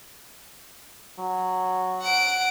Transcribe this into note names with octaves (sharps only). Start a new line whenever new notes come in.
F#3
F#5 D7